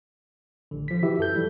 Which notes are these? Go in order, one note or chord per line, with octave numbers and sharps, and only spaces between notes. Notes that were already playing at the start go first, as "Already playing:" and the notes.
A1 D3
F3 B6
E3 E4 F#4 G4 E5
F#2 A4 G6
E3 G3 E4